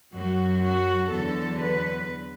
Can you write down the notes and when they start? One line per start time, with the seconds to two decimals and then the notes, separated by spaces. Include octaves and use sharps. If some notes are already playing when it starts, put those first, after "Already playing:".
0.13 F#2 F#3 F#4
0.63 F#4
1.12 E2 D3 F#3 A4
1.61 B4